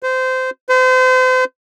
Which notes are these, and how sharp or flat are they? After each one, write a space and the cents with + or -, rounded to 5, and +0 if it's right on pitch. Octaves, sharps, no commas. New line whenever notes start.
C5 -20
C5 -35